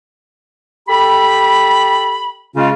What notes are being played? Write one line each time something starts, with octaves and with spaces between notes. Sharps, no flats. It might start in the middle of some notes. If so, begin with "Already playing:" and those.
G4 A4 B5
C#3 G#3 C#4 F4